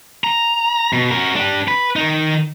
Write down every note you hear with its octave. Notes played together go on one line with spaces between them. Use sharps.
A#5
B2
F#4 A#4
D4 G4
B4
D#3 D#4